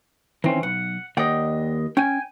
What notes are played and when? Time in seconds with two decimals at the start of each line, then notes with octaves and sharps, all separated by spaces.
0.44 D#3 E3 C4 C#4
0.63 B1 F#5
1.17 D#2 D5 D#5 F#5 G5
1.97 C#4 G5 G#5